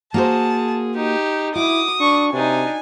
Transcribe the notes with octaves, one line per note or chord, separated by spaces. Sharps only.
A#3 F#4 G#4 C5 A5
D#4 G4
E4 F#4 D6 D#6
D4 C#6
C3 D4 D#4 G#5